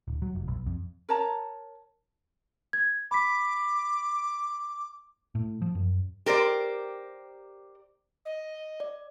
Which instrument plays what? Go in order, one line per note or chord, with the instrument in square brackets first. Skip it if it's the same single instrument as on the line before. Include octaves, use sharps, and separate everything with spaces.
[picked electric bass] D1
F#3
F1
B1
F2
[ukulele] A#4 C#5 A5 A#5
[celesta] G#6
[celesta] B5 B6 [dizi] D6
[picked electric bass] A2
F3
F#2
[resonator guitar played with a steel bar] G4 A#4 C5 D5
[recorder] D#5
[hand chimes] D5